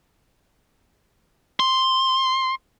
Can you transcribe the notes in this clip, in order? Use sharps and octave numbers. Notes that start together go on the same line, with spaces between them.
C6